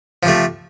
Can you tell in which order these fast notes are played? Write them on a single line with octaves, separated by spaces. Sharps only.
F3 C3 A3